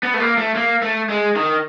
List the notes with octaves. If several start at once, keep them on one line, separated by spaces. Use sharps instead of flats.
B3
A3
A#3
A3
A#3
A3
G#3
D#3